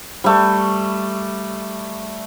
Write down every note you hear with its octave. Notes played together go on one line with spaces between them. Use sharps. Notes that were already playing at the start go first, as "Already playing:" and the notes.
G3 A3